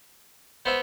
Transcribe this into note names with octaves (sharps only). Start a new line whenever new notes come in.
B3 C5 E5